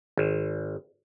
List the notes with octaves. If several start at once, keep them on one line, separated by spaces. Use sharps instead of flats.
G#1